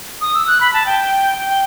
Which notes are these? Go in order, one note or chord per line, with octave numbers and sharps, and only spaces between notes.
D#6
E6
F#6
B5
A5
G5
G5